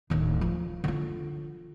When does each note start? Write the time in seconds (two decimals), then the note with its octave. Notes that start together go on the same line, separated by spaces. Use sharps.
0.10 D1 D#3
0.41 F3
0.84 D3 F4